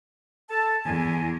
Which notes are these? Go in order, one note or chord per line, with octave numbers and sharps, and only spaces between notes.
A4 A5
E2 G#5